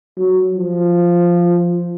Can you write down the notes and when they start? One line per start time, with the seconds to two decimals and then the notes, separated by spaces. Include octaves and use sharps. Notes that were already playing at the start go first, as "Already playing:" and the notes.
0.17 F#3
0.55 F3